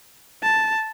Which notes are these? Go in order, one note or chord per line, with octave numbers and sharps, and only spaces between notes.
A5